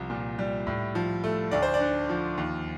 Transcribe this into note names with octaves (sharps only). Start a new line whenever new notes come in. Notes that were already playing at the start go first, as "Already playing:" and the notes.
Already playing: C2 F3
A#2
G3
A2
F3
A3
D2 D5
C5
D5
D3
F3
D#2